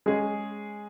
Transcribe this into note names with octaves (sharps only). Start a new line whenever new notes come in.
G#3 C#4 G#4